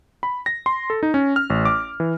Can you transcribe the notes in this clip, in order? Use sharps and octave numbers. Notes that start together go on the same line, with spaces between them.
B5
A#6
C6
A4
D#4
C#4
F6
A1
D6
E3